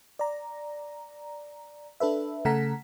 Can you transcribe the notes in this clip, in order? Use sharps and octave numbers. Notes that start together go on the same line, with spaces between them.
D5 A#5
D4 A4 B4 E5
C#3 A3 A4 F#5 A#5 B6